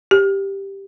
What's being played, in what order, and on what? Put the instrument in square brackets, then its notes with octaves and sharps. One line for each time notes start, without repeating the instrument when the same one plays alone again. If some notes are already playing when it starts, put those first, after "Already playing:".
[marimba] G4